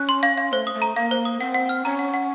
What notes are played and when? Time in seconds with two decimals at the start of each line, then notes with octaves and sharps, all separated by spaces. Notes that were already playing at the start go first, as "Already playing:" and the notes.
Already playing: C#4 F#6
0.09 C6
0.23 F5
0.38 F5
0.52 A3 C5
0.67 D#6
0.74 A3
0.82 A#5
0.96 A#3 F5
1.11 C5
1.25 D#6
1.40 C4 F#5
1.54 F#5
1.69 F6
1.84 C#4 A#5
1.99 F#5
2.14 F#5